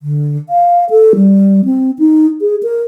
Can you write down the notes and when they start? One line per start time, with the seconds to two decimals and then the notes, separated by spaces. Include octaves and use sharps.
0.02 D3
0.49 F5
0.90 A4
1.16 G3
1.65 C4
1.99 D#4
2.41 G#4
2.63 A#4